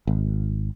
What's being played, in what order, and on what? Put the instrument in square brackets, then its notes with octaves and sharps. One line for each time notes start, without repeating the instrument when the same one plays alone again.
[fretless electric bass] G#1